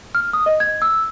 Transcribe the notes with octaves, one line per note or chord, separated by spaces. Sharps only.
F6
D#6
D#5
G#6
E6